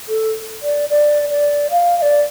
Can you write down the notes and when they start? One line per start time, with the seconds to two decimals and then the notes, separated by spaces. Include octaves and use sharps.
0.09 A4
0.62 D5
0.89 D5
1.31 D5
1.71 F5
1.98 F5
2.02 D5